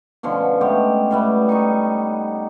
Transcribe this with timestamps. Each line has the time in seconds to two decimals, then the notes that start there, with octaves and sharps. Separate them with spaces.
0.23 B2 D3 F3 C#4
0.61 G#3 A3 B3 G4
1.11 A2 G3 B3
1.49 D#4 D#5 C#6